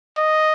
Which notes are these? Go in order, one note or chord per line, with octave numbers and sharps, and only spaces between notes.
D#5